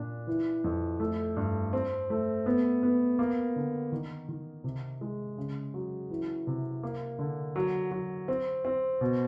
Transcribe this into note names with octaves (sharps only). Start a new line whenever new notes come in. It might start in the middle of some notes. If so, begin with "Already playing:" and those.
Already playing: A#2 D4
E3
F2
A3
G2
C4
A3
B3
B3
A#3
D3
D#3
D#3
C3
G#3
C#3
F#3
E3
C3
A#3
D3
F#3
F#3
C4
C4
B2